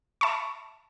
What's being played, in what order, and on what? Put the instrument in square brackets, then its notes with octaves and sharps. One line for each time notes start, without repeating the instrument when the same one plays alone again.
[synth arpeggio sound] E5 A5 B5 C#6